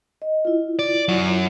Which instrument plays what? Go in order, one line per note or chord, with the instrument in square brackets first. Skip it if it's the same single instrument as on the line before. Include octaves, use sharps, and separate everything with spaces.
[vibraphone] D#5
E4 F4
[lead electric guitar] D5
F#2 F#4